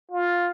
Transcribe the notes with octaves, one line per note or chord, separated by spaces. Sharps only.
F4